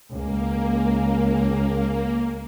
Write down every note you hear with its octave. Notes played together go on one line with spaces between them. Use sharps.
C#2 A#3